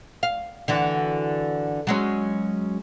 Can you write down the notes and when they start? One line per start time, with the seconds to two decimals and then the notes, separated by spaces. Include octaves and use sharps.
0.23 F5
0.68 D3 E3 F#4
1.87 F#3 G#3 C#4